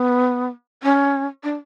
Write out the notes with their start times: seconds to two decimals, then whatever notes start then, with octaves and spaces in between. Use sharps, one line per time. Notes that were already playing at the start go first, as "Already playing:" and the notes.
Already playing: B3
0.83 C#4
1.44 D4